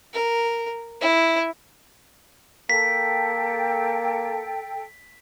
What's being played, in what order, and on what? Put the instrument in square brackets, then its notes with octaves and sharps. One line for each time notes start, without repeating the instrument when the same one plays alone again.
[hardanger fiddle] A#4
E4
[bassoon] A#3 [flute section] A4 G5 [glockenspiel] B6